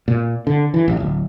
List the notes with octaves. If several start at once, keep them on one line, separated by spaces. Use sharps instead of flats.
A#2
D3
E3
A1
D1